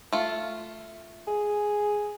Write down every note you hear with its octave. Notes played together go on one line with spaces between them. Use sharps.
A3 F4
G#4